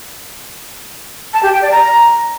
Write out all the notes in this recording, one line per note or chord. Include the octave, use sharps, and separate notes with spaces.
A5
G4
G5
D5
A#5